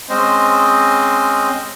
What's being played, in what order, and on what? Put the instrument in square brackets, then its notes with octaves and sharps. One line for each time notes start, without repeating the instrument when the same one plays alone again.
[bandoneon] G#3 C4 C#4 C5 D#5